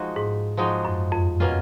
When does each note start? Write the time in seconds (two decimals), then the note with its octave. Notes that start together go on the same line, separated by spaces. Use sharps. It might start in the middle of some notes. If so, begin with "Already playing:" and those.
Already playing: F3 G#3 D#4 F#4
0.16 G#2
0.57 F3 G#3 D#4 F#4
0.85 F#2
1.12 F2
1.40 B2 A#3 C#4 F4